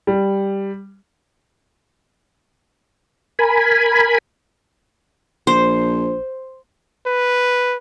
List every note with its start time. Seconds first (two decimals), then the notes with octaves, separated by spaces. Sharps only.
0.07 G3
3.39 A#4 G#5 B5
5.47 A#1 C5
7.07 B4